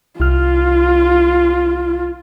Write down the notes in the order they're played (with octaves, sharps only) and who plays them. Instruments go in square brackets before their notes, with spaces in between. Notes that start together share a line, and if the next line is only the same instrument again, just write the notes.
[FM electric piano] C2 F6 [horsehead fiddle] F4